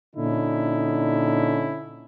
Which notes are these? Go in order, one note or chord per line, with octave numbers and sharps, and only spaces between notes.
A#2 D3 C#4 D#4 E4